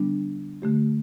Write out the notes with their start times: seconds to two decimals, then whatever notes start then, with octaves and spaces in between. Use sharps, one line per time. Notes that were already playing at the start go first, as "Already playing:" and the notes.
Already playing: D3 G3 B3 D4
0.62 D3 A3 G4